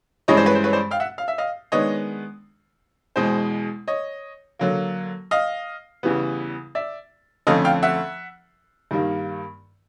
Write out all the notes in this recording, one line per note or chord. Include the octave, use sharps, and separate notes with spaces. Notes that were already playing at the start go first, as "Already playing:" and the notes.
G2 E3 G#3 C#4 C#5 D#5
C5 D5
B4 C#5
C5
B4 C#5
C5 D5
F5 G5
E5 F#5
F5
E5
D#5 F5
D#3 G#3 B3 D4 C#5 D#5
E2 B2 G#3 C5
C#5 D#5
D3 F#3 A#3
D#5 F5
E2 C#3 E3 G3 B3
D5 E5
F2 D3 F3 A3 C#4 D#5 F5
F5 G5
E5 F#5
G2 D#3 G3 A#3